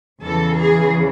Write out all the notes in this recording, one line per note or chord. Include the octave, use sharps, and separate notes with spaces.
E2 C#3 E3 A4
G#4